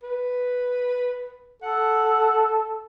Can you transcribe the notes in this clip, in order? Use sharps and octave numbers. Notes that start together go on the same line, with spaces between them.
B4
A4 F#5